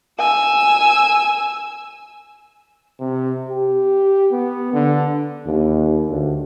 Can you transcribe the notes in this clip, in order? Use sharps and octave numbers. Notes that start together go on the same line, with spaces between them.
G#5 E6
C3
G4
B3
D3
D#2
D2